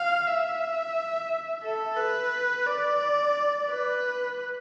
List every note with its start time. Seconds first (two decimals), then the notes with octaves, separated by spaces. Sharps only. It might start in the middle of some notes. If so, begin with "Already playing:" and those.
Already playing: F5
0.27 E5
1.63 A4
1.97 B4
2.66 D5
3.69 B4